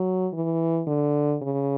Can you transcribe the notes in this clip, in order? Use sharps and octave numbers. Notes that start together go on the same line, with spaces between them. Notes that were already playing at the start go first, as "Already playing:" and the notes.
Already playing: F#3
E3
D3
C#3